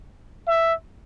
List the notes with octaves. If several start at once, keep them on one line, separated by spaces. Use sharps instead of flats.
E5